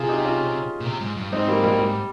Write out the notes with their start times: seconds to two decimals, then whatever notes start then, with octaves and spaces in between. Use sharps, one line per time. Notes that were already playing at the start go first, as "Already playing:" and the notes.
Already playing: C3 F4 G#4
0.09 D#4 G4
0.24 C#4 F4
0.80 A#2
0.86 C3
1.01 G#2
1.17 G2
1.32 G#2 C4 D#4
1.48 G3 A#3
1.63 G3 A#3
1.78 G3